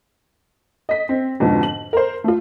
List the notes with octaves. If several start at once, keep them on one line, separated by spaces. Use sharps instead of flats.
D#5 B6
C4
F2 G#2 B2 D3
F#7
A#4 C5
A3 F4